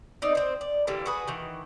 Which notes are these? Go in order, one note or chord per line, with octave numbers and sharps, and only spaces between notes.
C4 D#4 D5
C4 C5
D5
D3 E3 G3 A#3
F#4 G#4 B4
D#3 E3